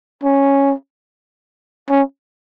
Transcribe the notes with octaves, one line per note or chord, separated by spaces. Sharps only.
C#4
C#4